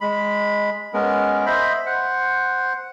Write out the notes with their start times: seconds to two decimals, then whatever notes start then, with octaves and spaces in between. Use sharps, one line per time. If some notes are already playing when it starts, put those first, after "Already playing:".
0.01 G#3 B5
0.94 G#3 B3 C#4 A#4
1.46 C5 D#5 E5 B5
1.86 C5 F#5